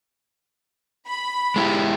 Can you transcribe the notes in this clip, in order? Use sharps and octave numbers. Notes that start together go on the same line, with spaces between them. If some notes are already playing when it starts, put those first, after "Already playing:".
B5
G#3 E4 G4